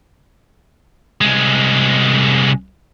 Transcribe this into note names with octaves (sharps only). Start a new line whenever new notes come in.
C2 G#3